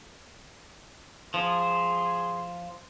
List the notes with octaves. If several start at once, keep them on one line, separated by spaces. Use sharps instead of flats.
F3 G#4 C6